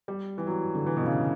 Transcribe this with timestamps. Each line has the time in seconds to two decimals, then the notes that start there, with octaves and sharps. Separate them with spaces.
0.08 G3
0.38 E3
0.47 F#3
0.75 D3
0.86 E3
0.97 B2
1.06 C#3